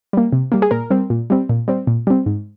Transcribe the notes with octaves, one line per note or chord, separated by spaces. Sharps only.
G3 A#3
C3
G3 A#3
G#4
A#2 A#4
G3 C4
A#2
G3 C4
A#2
G3 C4
A#2
G3 C4
G#2